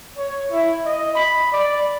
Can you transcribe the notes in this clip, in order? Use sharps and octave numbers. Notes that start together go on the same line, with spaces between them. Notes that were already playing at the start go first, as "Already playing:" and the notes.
C#5
E4
D#5
B5
D5